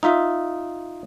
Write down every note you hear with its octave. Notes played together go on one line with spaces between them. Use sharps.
D#4 F4 E5